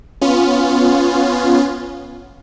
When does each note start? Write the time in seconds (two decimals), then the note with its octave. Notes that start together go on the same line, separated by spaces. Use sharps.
0.21 B3 C#4 F4